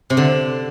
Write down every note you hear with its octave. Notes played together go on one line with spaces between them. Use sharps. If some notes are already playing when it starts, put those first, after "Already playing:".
C3
D3